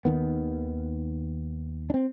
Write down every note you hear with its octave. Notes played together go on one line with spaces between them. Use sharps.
D#2 D#3 B3
C4 D4